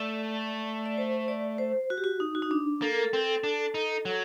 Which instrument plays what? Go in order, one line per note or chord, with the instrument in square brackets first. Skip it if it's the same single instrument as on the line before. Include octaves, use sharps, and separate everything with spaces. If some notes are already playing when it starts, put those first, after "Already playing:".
Already playing: [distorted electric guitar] A3 [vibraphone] D5
[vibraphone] D5
C5
D5
C5
F#4
G4
F#4
D#4
F#4
D#4
D4
[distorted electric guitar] A#3 [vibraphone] A4
[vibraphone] A#4
A4
[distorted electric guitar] C4
D4
D#4
F#3